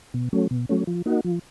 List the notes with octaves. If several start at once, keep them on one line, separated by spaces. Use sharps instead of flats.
B2
F#3 A3 C#4
B2
F#3 A3 C#4
F3
A#3 D#4 F#4
F3